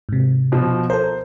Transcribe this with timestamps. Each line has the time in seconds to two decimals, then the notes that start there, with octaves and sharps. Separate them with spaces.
0.09 G#2 C3
0.52 B2 F3
0.90 A4 A#4 C5